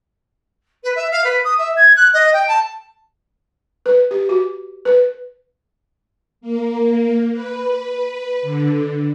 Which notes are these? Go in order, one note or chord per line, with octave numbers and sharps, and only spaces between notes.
B4
E5
F5
B4
D#6
E5
G#6
F#6
D#5
G5
A5
B4
G4
F#4
B4
A#3
B4
D3